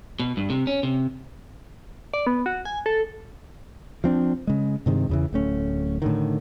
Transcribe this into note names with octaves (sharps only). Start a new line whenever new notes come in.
B2
G2
C3
C#4
C3
D5
B3
F#4
G#5
A4
F3 C4 D4
C#3 G#3
G2 C3 D#3 G#3
E2 C#3 E3
D1 A3 C#4
A2 D3 D#3